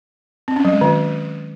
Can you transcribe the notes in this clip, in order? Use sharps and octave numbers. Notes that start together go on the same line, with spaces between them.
C4
C#4
F#3
G#3
D#3